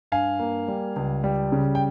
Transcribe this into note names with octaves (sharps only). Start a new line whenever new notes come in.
G2 F5 G#5
A#3
G3
C#2
G3
C#3
G5